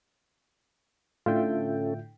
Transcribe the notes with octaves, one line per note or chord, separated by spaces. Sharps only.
A2 D3 C#4 F4 A4 E5 G5